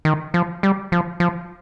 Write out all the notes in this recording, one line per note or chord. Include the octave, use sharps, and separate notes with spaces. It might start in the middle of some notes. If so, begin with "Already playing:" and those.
D#3
F3
G3
F3
F3